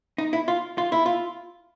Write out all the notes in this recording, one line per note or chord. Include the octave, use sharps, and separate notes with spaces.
D#4
E4
F4
F4
E4
F4